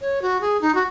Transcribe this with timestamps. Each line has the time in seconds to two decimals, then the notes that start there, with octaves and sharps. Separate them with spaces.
0.01 C#5
0.22 F#4
0.41 G#4
0.61 D#4
0.75 F#4